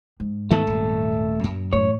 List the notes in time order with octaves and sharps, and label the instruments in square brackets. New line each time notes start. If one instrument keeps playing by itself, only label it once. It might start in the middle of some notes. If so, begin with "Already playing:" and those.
[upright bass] G#2
[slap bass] D2 D#3 B3 [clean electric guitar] A3 A4
[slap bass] D#1
[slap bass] F#2 [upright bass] A#2
[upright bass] A2 E3 [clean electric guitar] C#5